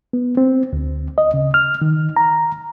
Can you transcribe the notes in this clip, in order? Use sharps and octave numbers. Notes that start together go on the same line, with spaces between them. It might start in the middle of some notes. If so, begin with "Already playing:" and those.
B3
C4
D2
D#5
C#3
F6
D#3
A#5